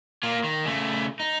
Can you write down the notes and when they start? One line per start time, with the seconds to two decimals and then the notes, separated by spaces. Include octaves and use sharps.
0.23 A#3 F4
0.44 D#3
0.66 C#3 A3
1.20 D#4